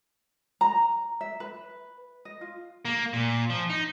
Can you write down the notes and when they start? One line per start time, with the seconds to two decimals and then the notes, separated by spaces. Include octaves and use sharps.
0.61 A#5
1.21 E5
1.40 B4
2.25 D#5
2.41 F4
2.85 A#3
3.13 A#2
3.50 F3
3.70 D#4